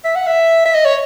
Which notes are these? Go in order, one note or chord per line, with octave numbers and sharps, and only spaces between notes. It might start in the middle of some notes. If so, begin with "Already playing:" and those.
E5
F#5
E5
E5
D#5
C#5